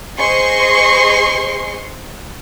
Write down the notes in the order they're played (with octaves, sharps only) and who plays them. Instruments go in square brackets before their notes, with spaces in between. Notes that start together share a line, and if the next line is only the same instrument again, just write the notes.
[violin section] G#4 C5 D#5 C6 C#6 C7